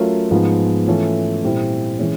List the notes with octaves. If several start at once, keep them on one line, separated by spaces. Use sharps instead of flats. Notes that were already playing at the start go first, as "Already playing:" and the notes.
Already playing: F#3 A3 C#4 F4 A#4
G#2 F3 G#3 B3
E3 A3 C#4 F4 A4
A#2 G3 C4 E4
E3 G#3 C#4